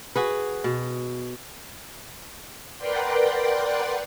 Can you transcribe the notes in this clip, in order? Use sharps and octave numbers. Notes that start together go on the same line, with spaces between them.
F#4 G#4 B4
B2
A#4 B4 D5 F#5 G5 C6